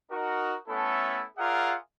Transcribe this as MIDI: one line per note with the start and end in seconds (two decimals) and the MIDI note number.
0.11 0.54 63
0.11 0.54 66
0.11 0.54 70
0.68 1.23 57
0.68 1.23 59
0.68 1.23 61
0.68 1.23 64
0.68 1.23 69
1.38 1.74 65
1.38 1.74 68
1.38 1.74 70
1.38 1.74 74
1.38 1.74 76
1.38 1.74 78